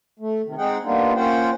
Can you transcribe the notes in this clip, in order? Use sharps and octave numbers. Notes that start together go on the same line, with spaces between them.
A3
C3 D#3
G#3 C4 D#4 G#4 F#5 G5
G3 A#3 B3 D4 D#4 F4
A#3 C#4 F4 C5 F#5 G5